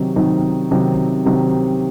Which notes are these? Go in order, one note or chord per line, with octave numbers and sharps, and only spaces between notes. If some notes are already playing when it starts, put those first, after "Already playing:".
Already playing: C3 D#3 F#3 C4 D#4
C3 D#3 F#3 C4 D#4
C3 D#3 F#3 C4 D#4
C3 D#3 F#3 C4 D#4